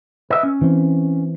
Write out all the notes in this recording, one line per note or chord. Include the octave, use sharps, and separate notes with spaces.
B4 D#5 E5
C#4
E3 C4